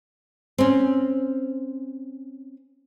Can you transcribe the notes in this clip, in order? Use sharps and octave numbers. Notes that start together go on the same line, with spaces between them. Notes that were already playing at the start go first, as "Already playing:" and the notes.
C4 C#4